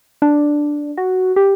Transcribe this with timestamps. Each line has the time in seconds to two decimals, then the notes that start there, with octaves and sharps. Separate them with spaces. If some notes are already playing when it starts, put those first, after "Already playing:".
0.22 D4
0.98 F#4
1.36 G4